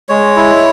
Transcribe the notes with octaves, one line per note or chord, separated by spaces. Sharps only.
G#3 C#5
E4